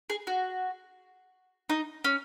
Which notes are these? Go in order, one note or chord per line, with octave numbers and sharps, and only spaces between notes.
G#4
F#4
D#4
C#4